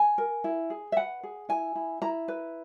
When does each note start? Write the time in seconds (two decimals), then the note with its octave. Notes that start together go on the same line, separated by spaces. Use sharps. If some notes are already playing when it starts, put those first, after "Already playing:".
Already playing: G#5
0.18 A#4
0.44 E4
0.70 G#4
0.92 E5
0.97 B4 F#5
1.23 G#4
1.49 E4 G#5
1.75 E4
2.02 E4 A#5
2.28 B4